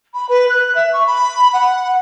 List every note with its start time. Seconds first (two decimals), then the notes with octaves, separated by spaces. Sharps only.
0.13 B5
0.28 B4
0.48 F#6
0.74 E5
0.93 C#6
1.06 B5
1.53 F#5